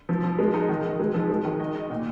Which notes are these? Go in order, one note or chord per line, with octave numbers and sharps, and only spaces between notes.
F3
F3
G#3
D#4
D#3
D#3
G#3
F3
G#3
D#3
D#5
D#5
A#2